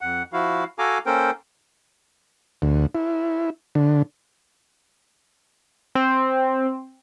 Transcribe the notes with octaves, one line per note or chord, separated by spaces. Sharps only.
F2 F#5
F3 E4 F#4 F5
F#4 A4 F5 G#5 A#5 D6
A#3 C#4 A4 A#4 C5 G5
D2
E4
D3
C4